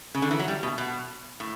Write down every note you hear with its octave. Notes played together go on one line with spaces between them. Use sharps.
C#3
D3
E3
F#3
G3
B2
B2
A2